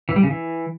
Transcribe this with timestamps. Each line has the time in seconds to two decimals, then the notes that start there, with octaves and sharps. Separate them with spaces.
0.09 E3
0.16 G3
0.23 C#3
0.31 E3